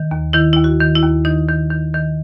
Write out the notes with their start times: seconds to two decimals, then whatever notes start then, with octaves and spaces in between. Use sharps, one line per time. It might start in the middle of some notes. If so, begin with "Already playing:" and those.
Already playing: D#3
0.11 D#2
0.33 D#3 E4
0.53 D#2 E4
0.64 F#4
0.80 D#3
0.95 E4
1.03 D#2
1.25 D#3 D#4
1.49 D#3
1.70 D#3
1.94 D#3